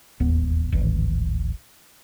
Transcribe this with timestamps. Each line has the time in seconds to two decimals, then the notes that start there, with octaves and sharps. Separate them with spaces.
0.20 E1 A1 D#2 B3
0.72 D1 G#1 E3